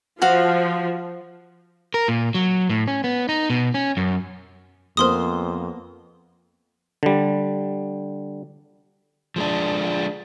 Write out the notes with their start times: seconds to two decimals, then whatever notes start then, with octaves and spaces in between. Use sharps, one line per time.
0.22 F3 F#4 F5
1.94 A#4
2.08 A#2
2.35 F#3
2.69 A2
2.88 C#4
3.04 B3
3.29 D#4
3.50 B2
3.74 C#4
3.97 F#2
4.97 F2 A#3 B3 A#4 C5 C6 D#6
7.03 D3 G3
9.36 F3 G#3 D4